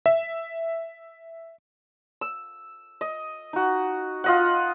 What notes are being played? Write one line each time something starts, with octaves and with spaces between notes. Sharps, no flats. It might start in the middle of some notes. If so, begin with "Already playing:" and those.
E5
E6
D#5
D#4 F#4
F4 D#5 F#5